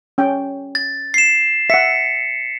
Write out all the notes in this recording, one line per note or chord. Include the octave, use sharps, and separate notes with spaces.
C#4 G5
A6
C7 E7
E5 F#5 B6 C#7